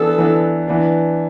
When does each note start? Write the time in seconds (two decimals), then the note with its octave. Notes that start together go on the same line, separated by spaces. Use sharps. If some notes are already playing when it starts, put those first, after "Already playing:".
Already playing: E3 B3 D4 A4
0.18 E3 B3 D4
0.68 E3 B3 D4